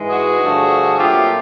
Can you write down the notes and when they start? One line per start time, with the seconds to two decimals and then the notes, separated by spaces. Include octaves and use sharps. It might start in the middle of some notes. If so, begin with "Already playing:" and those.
Already playing: G#2 E3 G#3
0.10 F#4 G#4
0.40 G2 D3 F3 A3
0.99 A#2 F#3 A3 C4 F4 G4